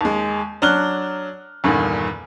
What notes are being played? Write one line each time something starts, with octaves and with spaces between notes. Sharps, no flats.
D#2 G#3
F#3 D4 F6 F#6 G7
E2 G2 A#2 D3 D#3